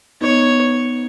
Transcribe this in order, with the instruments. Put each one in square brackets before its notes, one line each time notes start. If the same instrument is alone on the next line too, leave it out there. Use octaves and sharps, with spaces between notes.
[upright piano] B3 D#4 [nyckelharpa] C#5